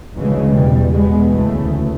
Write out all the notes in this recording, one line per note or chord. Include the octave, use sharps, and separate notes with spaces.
D2 C#3 E3 G#3
E2 B2 G3
B2 G#3 B3
D2 C#3 E3 A3